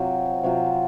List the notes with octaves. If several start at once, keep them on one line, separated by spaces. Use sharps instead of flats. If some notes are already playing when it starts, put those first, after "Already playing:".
Already playing: C3 F#3 C4 F4
C3 F#3 C4 F4